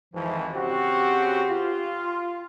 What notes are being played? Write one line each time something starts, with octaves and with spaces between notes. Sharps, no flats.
G#1 F2 E3 F3
C#3 C4 F#4 G4
F4